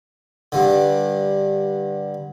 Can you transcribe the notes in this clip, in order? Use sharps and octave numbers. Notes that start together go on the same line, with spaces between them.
G2 D3